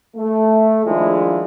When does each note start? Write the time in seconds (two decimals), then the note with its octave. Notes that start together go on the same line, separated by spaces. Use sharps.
0.17 A3
0.86 D#3 F3 G#3 D4 E4 F4